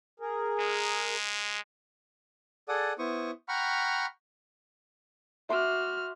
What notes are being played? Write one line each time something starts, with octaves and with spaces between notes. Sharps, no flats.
G#4 A#4
G#3
G#4 A4 D5 F#5 D#6
B3 E4 C5 C#6 D#6
F#5 G5 A#5 B5 C#6 F6
F#4 E5 C6 D6 F6